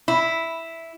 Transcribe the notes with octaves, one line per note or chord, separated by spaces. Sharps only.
E4